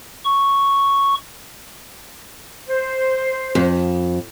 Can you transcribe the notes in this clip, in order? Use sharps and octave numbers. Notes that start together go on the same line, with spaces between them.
C#6
C5
F2